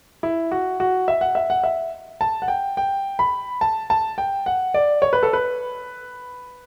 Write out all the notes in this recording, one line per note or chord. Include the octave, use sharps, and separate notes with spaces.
E4
F#4
F#4
E5
F#5
E5
F#5
E5
A5
F#5
G5
G5
B5
A5
A5
G5
F#5
D5
C#5
B4
A4
B4